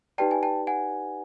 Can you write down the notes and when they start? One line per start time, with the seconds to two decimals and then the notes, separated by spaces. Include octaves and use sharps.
0.18 D#4 G4 B4 D5 G5 A5
0.31 G#5
0.43 G5 A5
0.67 F#5 G#5